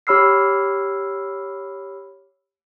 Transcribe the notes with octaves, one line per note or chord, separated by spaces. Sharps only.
G4 C#5 B5 E6 F6 C7